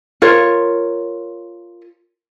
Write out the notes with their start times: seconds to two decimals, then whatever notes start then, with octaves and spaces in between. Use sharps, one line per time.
0.22 F4 A#4 C#5